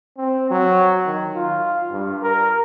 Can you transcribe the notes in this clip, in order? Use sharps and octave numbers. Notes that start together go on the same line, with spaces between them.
C4
F#3
D#3
F4
G2
A#4